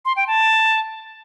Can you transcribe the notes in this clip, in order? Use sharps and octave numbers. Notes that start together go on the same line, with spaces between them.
C6
G5
A5